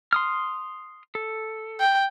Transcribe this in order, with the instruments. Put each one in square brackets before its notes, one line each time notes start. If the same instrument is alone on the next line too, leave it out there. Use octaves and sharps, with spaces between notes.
[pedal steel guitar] C6 D#6 F6
A4
[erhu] G5